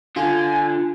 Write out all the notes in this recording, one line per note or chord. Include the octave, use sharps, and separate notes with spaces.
D3 F4 G#5